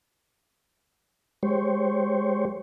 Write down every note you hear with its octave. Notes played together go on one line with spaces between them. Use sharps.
G#3 G4 C5 C#5